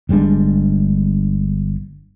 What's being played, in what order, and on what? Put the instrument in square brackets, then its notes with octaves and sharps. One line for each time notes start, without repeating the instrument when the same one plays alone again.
[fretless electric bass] G1 G3 G#3 D4